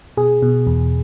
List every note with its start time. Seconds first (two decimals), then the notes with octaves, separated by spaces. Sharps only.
0.17 B2 G#4
0.42 B2
0.67 E2